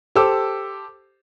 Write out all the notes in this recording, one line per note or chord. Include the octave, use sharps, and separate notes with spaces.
G4 A4 C5 D6 E6